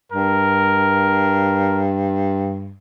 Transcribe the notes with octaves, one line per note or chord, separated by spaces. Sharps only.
G2 A#4